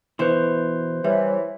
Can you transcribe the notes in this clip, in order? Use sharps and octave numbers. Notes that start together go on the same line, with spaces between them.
B2 E3 E4 B4 C5 C6
E3 G3 C#5